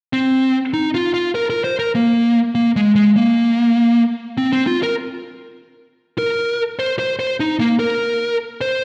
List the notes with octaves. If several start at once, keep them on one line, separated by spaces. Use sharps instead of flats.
C4
D#4
F4
F4
A#4
A#4
C5
A#4
A#3
A#3
G#3
G#3
A#3
C4
C4
F4
A#4
A#4
C5
C5
C5
D#4
A#3
A#4
C5